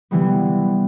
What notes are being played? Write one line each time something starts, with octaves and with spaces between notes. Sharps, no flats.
C3 E3 G3 B3